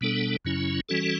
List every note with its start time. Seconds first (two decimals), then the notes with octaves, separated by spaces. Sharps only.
0.01 B2 G3 B3 D4 A4
0.45 F#2 C#3 F#3 C#4 E4
0.89 E3 G3 C#4 F#4 A4